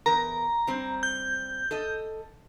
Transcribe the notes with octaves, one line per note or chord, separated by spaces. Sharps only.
E2 A#4 A#5
G3 C4
G6
A4 D#5